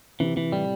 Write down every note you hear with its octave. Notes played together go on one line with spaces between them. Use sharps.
C3 E3
C3 E3
A2 G3